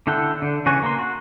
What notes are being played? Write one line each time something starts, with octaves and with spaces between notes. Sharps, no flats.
D3 E4 A4 F#5 G5
D3
C#3 E3 F#4 G#5 C#6
A#3 C6
F#4